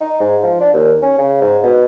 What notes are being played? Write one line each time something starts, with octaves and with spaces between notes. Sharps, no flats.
D#4
G#2
F3
D4
D#2
C#4
C#3
G#2
B2